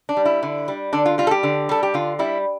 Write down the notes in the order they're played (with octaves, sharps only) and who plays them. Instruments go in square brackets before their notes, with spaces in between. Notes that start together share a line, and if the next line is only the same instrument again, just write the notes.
[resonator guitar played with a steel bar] D4
G3
E4
D3
G3
D3 D4
F4
G3 F4
A4
G4
D3
G3 A4
G4
D3 F4
G3 E4